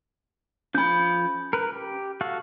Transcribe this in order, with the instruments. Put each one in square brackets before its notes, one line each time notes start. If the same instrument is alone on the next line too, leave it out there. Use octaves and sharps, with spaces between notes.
[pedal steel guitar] F3 G6 [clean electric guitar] C#4 B5
[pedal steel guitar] A#4 B4
G4
F#4 A4 F5